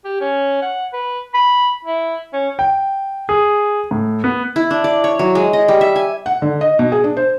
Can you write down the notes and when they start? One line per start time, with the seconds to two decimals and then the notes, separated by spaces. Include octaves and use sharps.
0.05 G4
0.21 C#4
0.62 F#5
0.93 B4
1.34 B5
1.85 E4
2.33 C#4
2.59 G5
3.29 G#4
3.91 A2
4.24 B3
4.56 E4
4.71 D4
4.84 D5
5.04 C#5
5.19 F#3
5.35 G#3
5.53 D#5
5.68 G3
5.81 E5
5.96 G#5
6.26 F#5
6.42 D3
6.61 D#5
6.79 B2
6.92 G#4
7.04 D4
7.17 C5